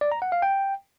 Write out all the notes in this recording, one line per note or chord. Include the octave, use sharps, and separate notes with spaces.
D5
A#5
F#5
F5
G5